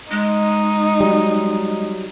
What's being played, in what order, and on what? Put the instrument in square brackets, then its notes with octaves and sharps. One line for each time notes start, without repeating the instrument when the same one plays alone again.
[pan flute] G#3 [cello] D#4
[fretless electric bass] F#3 G3